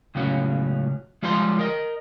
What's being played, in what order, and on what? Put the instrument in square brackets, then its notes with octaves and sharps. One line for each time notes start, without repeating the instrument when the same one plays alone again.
[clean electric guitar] C#2 A2 C#3 F#3 C#4
F3 G3 G#3 F4 C5 C6
A#4 D#5